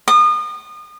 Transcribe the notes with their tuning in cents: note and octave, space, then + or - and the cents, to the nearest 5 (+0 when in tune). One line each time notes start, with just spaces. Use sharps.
D#6 -35